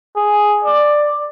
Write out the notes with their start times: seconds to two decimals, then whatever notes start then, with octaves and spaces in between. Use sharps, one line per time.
0.16 G#4
0.65 D5